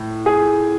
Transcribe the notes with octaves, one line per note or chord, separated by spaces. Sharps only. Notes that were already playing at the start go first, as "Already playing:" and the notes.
Already playing: A2
G#4